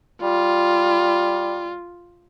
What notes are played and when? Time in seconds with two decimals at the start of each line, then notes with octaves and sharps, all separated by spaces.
0.23 G3 F4